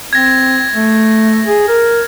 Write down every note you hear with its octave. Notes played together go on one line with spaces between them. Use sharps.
C4 G#6 A#6
A3
G#4
A#4